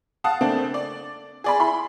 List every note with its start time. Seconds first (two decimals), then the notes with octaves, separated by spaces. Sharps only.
0.24 F5 F#5 A5 D#6
0.41 C#3 A3 A#3 C4 D4
0.74 D5
1.44 G#4 D5 B5
1.60 E4 B5 C6